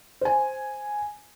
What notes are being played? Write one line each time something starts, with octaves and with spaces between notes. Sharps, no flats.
C5 G#5